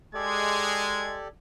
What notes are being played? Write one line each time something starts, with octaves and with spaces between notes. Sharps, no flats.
G#3 G4 A4 D5 G#6